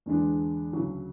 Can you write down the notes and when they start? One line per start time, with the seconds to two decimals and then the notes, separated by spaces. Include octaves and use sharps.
0.06 E2 D3 G#3 D4
0.73 D2 C#3 F#3